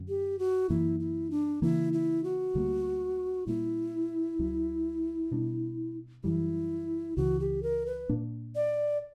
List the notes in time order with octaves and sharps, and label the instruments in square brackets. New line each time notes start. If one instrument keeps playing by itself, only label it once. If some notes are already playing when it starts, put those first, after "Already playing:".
Already playing: [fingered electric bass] F#2 D3 F#3 C#4
[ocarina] G4
F#4
[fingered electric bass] F#2 E3 A#3 [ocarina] E4
[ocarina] E4
D4
[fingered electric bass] C#3 E3 A#3 [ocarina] E4
[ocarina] E4
F#4
[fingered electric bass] D2 D3 G3 A#3
[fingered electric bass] A#2 G3 A#3 [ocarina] E4
[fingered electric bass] C#2 C#3 F#3
B2 G3 B3 D4
[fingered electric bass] F#2 E3 G3 [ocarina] E4
[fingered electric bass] C#2 C#3 E3 [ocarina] F#4
[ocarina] G4
A#4
B4
[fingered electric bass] A#2 A#3 D4
[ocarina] D5